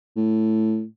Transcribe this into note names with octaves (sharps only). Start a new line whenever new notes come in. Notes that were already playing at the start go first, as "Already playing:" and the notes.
A2